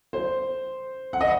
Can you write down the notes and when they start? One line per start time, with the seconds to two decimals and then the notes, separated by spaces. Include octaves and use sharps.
0.13 C5
1.13 F#5
1.21 D#5